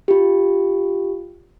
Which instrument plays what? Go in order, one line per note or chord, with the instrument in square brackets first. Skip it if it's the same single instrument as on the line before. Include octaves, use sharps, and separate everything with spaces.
[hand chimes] F4 G4